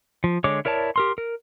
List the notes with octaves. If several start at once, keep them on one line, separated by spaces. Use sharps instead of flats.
F3
D3 G#3 C#5 D6
E4 A#4 C#5 D5 A5
G4 A#4 C6
A#4